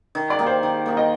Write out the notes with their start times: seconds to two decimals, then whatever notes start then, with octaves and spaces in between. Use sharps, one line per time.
0.15 D#3
0.30 D5
0.39 A#3 D#4 G4
0.46 C5
0.63 D#3
0.86 A#3 D#4 G4
0.97 D#5